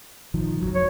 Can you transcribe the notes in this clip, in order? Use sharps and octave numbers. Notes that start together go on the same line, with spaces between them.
A#1 D#3 F3
F1 C#2 F#3
C#5